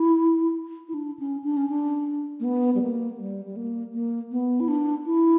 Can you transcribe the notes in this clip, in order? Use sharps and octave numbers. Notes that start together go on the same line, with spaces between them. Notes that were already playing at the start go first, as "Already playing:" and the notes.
Already playing: E4
E4
D4
C#4
D4
C#4
D4
A#3
B3
G3
A#3
G3
G3
A#3
A#3
B3
E4
D4
E4